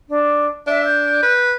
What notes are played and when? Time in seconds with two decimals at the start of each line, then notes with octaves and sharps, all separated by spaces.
0.09 D4
0.67 D4 E5
0.85 G6
1.23 B4